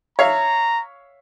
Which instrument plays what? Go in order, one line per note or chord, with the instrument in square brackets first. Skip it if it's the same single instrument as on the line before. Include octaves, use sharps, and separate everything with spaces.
[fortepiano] C#5 E5 F5 [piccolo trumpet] A#5